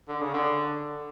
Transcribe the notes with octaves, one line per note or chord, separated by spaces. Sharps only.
D3
C#3
D3